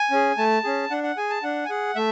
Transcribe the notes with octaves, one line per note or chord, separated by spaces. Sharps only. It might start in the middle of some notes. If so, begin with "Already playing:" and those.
Already playing: G#5
C#4 G#4
A3 A5
C#4 G#4
D4 F#5
F#5
G#4 G#5
A5
D4 F#5
G#5
G#4 F#5
A3 E5